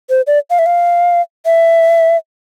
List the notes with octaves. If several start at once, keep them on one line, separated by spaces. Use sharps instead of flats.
C5
D5
F5
E5
F5
E5